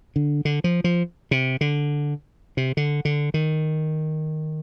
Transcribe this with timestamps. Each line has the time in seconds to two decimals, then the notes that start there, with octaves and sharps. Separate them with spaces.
0.16 D3
0.45 D3
0.64 F3
0.84 F3
1.31 C3
1.61 D3
2.57 C3
2.77 D3
3.05 D3
3.34 D#3